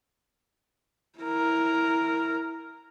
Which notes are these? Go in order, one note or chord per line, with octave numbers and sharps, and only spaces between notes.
E4 A#4